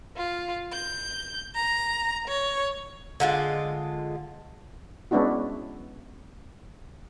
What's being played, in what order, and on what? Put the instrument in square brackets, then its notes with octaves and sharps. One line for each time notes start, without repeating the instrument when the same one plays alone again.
[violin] F4
G6
A#5
C#5
[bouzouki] D3 G#3 F4
[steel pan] G#3 B3 C#4 D4 E4 F#4